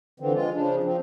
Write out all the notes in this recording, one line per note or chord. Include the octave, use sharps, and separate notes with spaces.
D3 E3 F3 C4
G#3 F4
C#3 F3 D4
F3 C4